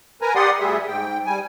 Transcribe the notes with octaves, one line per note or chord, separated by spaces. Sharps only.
A#4 B4 G#5 A#5
G4 D5 F#5 C6 D#6
D2 G3 G#4 E5
G#2 G5
G3 G#5